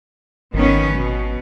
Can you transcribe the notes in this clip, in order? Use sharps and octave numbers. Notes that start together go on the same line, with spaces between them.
G#1 D#3 B3 C#4
B2